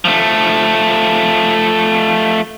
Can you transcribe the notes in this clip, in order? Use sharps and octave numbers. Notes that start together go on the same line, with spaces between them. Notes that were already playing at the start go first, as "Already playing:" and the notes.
F3 A3